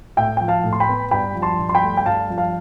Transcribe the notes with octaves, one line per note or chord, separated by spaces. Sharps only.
A2 E5 G5
F3 G5
F5 A5
A2
C6
G5 B5
B3
G2 G5 B5
F3
A5 C6
G2
C6
G5 B5
A3
G5
G2 F5 A5
F3
F5 A5